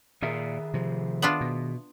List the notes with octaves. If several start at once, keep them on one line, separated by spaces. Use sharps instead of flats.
A#2 D#3 G#4 E5
C3 F3
B3 D4 F4
B2